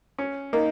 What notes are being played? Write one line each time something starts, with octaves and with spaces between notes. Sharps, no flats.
C#4
A#3 D#4